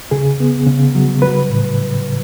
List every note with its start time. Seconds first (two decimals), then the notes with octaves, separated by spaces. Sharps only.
0.11 C#3 G#4
0.40 B3
0.67 C#3
0.95 F#3
1.22 F#3 B4
1.50 A2